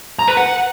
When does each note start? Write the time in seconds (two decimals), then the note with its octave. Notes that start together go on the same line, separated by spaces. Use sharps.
0.19 A#5
0.28 B4
0.37 F#5